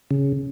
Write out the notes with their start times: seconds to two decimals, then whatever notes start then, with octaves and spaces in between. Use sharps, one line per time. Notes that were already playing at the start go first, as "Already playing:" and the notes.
0.11 C#3